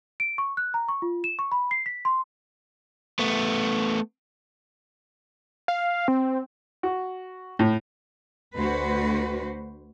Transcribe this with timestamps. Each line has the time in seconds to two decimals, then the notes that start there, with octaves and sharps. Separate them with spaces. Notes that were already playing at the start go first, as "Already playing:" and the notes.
0.20 D7
0.38 C#6
0.57 F#6
0.74 A#5
0.89 C#6
1.02 F4
1.24 E7
1.39 C#6
1.52 B5
1.71 C7
1.86 B6
2.05 C6
3.19 A3 B3
5.68 F5
6.08 C4
6.83 F#4
7.59 A2
8.57 D2 F#4 B4 C5